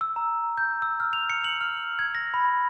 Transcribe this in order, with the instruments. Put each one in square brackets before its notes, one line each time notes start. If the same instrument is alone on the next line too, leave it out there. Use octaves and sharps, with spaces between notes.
[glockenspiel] E6
A#5
G6
E6
F6
F7
C#7
F#7
F6
G#6
A#6
B5